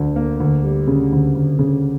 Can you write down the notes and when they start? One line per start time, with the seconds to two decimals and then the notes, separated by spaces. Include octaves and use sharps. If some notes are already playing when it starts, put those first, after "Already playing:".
Already playing: D2 D3
0.16 A#3
0.40 D2
0.64 G3
0.87 C#3
1.12 D2
1.35 D2
1.59 C#3